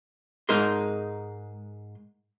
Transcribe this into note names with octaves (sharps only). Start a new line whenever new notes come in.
G#2 G#3 D#4 A#4 C6